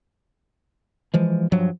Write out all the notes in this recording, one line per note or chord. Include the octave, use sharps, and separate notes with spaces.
E3 F3 G#3
G2 F3 F#3